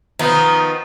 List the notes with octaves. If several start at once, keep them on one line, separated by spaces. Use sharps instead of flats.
D#3 F3 B3 D#4